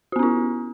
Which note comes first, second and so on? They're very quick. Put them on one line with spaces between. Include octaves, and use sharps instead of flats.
F#4 B3 C#4 E4